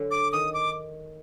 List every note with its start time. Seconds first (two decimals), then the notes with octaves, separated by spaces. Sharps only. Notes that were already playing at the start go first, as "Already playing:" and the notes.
Already playing: D3 F#3
0.11 D6
0.33 D#3 D#6
0.54 D6